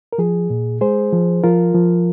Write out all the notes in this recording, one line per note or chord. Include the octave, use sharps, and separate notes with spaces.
A#4
F3 G#4
A#2
G#3 G#4 C5
F3
F3 F4 A#4
F3